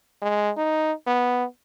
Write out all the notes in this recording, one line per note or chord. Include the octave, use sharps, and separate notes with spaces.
G#3
D#4
B3